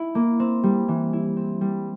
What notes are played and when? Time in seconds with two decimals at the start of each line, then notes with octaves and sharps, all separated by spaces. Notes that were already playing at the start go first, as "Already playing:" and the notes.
Already playing: E4
0.15 A#3
0.40 C4
0.63 G3
0.88 E3
1.13 E4
1.37 C4
1.61 G3